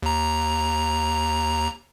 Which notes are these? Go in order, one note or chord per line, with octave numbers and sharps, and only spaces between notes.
D#2 A#5